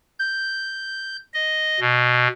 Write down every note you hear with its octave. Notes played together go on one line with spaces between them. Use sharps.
G6
D#5
B2